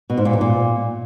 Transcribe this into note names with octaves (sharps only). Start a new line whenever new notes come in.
B2
G#2
A#2
E2
A#2